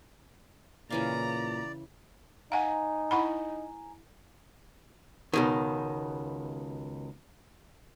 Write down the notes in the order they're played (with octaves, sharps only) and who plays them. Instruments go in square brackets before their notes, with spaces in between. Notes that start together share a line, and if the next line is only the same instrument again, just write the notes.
[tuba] A#2 [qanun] C#3 E3 F5 [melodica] D5 [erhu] A#5
[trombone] D#4 [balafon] F5 F#5 [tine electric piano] G#5 A#5
[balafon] E4 F#5 B5
[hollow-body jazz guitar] C#2 B2 D#3